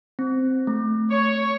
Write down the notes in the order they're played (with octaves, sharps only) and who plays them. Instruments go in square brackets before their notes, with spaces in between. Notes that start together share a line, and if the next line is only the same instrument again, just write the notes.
[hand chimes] C4
A3
[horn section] C#5